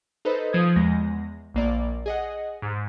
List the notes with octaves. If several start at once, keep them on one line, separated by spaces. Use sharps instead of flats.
D#4 A4 B4 C5 D#5
F3 D#6 G#6
E2 G#3 A#6
A#1 A#3 D5
G#4 D#5 F#5
G#2